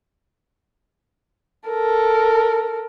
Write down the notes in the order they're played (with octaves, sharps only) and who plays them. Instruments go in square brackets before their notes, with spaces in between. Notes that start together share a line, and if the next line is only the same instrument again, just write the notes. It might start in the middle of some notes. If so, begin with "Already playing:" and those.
[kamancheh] A4 A#4